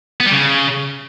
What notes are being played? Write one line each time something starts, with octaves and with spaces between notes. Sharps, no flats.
B3
G3
C#3